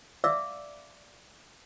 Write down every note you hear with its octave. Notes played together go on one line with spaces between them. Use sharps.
D5 E5 F5 D6 E6